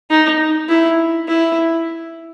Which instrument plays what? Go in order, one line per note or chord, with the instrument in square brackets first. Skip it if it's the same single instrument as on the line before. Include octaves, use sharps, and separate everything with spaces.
[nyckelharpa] D#4
E4
E4